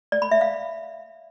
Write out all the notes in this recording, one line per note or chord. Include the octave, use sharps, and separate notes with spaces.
D5
B5
E5
F5